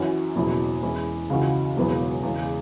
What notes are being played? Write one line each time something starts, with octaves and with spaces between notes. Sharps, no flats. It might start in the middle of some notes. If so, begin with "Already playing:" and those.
Already playing: F#2 E3 C#4 F#4
F#1 E2 B2 F#3 E4
E2 E3 G#3 C#4 E4
C#2 C#3 E3 C#4 F#4
E1 E2 C#3 F#3 B3
E2 C#3 G#3